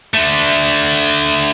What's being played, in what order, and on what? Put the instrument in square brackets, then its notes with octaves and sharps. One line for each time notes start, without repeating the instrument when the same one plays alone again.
[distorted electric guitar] D3 A3